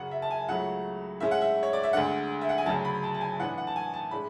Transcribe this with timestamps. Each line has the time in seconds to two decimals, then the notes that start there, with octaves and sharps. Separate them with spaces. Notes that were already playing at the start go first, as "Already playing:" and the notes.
Already playing: F#2 C#3 F#3 F#5
0.11 E5
0.22 A5
0.31 G#5
0.48 C#2 C#3 F#3 A3 F#5
1.20 A2 G#3 C#4 E5
1.31 F#5
1.41 E5
1.63 C#5
1.73 D5
1.83 E5
1.93 D2 D3 G#3 D4 F#5
2.41 E5
2.49 F#5
2.58 G#5
2.66 D2 C#3 F#3 A5
2.85 B5
3.03 A5
3.15 A5
3.21 G#5
3.39 A2 E3 B3 D4 F#5
3.58 F#5
3.67 A5
3.76 G#5
3.94 A5
4.11 A2 G#3 D4 B5